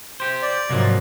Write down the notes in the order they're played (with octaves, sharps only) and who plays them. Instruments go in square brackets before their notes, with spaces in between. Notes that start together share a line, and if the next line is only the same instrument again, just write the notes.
[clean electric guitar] G4 C5
[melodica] D5
[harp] G#2 C3 [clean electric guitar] F3 F#3 A#3